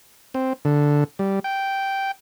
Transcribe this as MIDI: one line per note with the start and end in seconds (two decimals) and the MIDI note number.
0.34 0.53 60
0.65 1.04 50
1.19 1.40 55
1.44 2.11 79